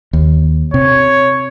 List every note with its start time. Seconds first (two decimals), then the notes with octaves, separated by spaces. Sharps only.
0.13 D#2
0.74 C3 C#5